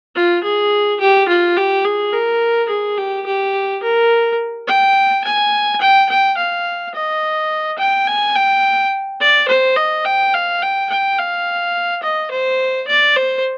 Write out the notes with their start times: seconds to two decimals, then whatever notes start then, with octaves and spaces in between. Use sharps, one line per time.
0.15 F4
0.44 G#4
1.00 G4
1.28 F4
1.57 G4
1.85 G#4
2.13 A#4
2.69 G#4
2.98 G4
3.26 G4
3.83 A#4
4.67 G5
5.24 G#5
5.81 G5
6.09 G5
6.37 F5
6.94 D#5
7.79 G5
8.07 G#5
8.36 G5
9.20 D5
9.48 C5
9.76 D#5
10.05 G5
10.34 F5
10.62 G5
10.90 G5
11.18 F5
12.03 D#5
12.31 C5
12.88 D5
13.16 C5